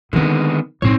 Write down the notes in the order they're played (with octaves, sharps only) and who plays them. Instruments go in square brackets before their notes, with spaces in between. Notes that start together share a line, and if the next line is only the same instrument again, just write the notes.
[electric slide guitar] D3 G#3 B3 [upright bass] D#3 C4
[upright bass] A2 D#4 [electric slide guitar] C4 C#5